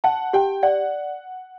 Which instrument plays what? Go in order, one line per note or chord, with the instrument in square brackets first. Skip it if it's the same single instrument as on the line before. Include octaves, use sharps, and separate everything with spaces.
[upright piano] F#5 [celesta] A5
[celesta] G4 [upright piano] G5
[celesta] D5 [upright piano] F#5